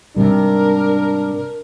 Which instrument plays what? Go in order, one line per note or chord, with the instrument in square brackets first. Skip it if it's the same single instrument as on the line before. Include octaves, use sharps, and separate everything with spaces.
[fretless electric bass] G#2 C3 G3 [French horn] D4 [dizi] A#4